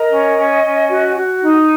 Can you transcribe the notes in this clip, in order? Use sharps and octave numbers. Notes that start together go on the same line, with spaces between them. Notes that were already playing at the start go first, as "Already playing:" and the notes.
Already playing: A#4 D#5
C#4
C#4
C#4
F#4
F#4
D#4